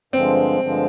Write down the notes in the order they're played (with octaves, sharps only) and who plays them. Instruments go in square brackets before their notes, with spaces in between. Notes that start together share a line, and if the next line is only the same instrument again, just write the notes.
[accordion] G2 D3 F3 G#3 [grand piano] C4
[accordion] G2 D3 F3 G#3